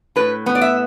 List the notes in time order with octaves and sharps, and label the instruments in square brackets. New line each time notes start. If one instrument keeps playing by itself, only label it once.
[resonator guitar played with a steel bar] A2 B4
B3
D5
E5